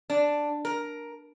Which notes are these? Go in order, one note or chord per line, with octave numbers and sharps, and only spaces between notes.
D4
A#4